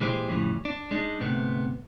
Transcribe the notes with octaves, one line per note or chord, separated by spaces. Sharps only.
A#2 E3 G#3 E4 G4 C5
F2 A2 C#3 E3 G3
D4
G#3 D4 D#4
D2 G#2 C3 A3 B3